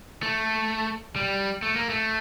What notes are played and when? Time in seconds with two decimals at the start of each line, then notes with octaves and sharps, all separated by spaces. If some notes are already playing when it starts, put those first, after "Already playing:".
0.22 A3
1.16 G3
1.63 A3
1.76 A#3
1.89 A3